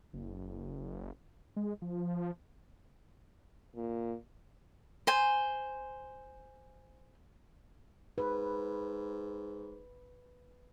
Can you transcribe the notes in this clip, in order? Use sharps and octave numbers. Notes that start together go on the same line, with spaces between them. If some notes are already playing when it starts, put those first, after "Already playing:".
F#1
G#3
F3
A#2
C5 G#5
G#2 B4